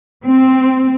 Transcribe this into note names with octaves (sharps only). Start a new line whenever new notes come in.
C4